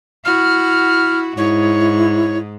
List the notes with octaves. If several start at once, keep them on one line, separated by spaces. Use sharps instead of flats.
E4 F#4 F6
G#2 E4 C#5